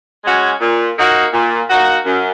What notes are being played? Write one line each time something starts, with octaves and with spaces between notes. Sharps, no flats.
G#3 C#4 F#4
A#2
A#3 D#4 F#4
A#2
A#3 D#4 F#4
F#2